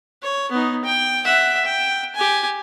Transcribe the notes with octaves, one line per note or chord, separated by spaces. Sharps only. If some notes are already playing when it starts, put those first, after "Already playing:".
C#5
B3 D#4
G5
E5 F#5
G5
G4 G#5